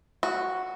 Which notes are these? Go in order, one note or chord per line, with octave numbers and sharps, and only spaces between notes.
F#4